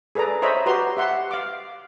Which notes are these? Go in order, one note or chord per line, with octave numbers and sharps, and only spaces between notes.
G#4 A4 B4 D5 A#5
C5 C#5 D#5 E5 A#5 B5
F#4 G4 B4 A#5 C6
G4 E5 F#5 C6
F5 D6